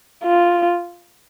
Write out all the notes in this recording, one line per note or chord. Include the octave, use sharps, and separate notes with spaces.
F4